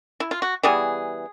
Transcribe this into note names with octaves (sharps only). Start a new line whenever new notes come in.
E4
F4
F#4
E3 G3 B3 G#4